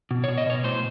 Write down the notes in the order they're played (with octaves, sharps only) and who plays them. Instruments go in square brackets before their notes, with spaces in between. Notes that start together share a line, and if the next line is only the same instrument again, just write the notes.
[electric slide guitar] B2
C#5
B2
D#5
B2 C#5
A2 C5